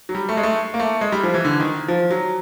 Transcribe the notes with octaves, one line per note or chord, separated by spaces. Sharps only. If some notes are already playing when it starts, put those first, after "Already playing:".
F#3
G3
A3
G#3
A3
A#3
A3
G#3
G3
F3
E3
D3
D#3
F3
F#3